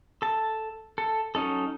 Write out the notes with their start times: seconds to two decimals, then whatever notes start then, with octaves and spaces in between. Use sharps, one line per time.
0.22 A4 A5
0.98 A4
1.35 F#3 C#4 D#4 A4